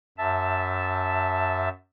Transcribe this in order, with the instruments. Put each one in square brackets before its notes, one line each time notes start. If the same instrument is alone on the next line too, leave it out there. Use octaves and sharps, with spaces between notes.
[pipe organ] F#2 E5 A5